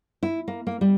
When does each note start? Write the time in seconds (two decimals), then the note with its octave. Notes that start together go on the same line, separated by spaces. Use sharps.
0.23 E4
0.48 A#3
0.67 A#3
0.81 G3